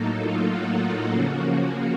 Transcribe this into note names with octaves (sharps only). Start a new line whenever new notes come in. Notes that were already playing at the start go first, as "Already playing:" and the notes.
Already playing: A2 F#3 A#3 D#4 A4
F4
F#4
C#3 F3 A#3 C#4